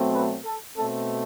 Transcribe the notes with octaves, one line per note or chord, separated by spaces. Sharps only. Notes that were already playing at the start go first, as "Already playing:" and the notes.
Already playing: B2 F#3 A3 C4
B4
A4
B2 A3 C4 A4